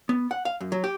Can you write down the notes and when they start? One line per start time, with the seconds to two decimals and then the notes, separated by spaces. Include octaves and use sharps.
0.09 B3
0.31 F#5
0.45 F5
0.61 F#2
0.72 F#3
0.84 G4